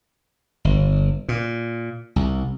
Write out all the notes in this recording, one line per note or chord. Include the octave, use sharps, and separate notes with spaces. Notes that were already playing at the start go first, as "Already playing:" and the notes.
G1
A#2
C2